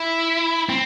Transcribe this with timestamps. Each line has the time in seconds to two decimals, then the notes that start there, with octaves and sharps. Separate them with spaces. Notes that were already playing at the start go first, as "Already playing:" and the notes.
Already playing: E4
0.69 C4